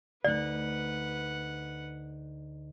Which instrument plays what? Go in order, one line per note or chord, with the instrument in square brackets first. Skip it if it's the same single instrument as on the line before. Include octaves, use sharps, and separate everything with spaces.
[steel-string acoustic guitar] D2 D#4 [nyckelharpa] B4 F#5 [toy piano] D5